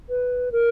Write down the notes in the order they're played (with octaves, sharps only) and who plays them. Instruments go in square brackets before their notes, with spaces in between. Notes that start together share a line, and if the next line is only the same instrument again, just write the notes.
[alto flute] B4
A#4